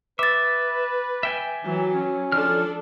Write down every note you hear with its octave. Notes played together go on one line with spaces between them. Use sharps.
B4 E5 D6 A6
E5 G5 G#5
E3 F#3
C#4
F3 D4 A4 F6